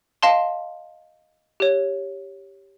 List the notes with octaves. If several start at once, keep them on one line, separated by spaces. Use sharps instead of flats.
D#5 F5 A5 C6
G4 C#5